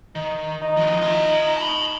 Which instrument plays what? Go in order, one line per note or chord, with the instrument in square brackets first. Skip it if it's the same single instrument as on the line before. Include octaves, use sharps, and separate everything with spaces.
[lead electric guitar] D#3 [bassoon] D#4
[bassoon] D#4
[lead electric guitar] D#3 F3
F4 E5
A5 B5